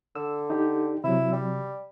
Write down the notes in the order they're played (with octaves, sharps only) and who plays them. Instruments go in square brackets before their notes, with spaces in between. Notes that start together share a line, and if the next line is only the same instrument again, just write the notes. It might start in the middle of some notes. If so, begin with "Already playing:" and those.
[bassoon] D3 [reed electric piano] E6
[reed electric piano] D#4 G4
[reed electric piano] C3 F#3 [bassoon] E4
[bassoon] G3